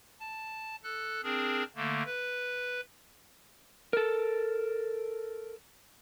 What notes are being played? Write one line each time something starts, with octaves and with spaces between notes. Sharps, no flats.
A5
A4 F#6
C4 D4 G#4 A#4
D3 A3 A#3
B4
A4 A#4